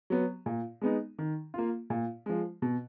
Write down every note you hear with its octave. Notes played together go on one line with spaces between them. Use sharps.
F#3 B3
A#2
G#3 B3 D#4
D#3
A#3 F4
A#2
F3 G#3
B2